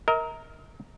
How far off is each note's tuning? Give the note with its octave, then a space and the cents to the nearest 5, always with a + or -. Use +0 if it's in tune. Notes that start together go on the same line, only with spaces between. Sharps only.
A#4 +0 D#5 +45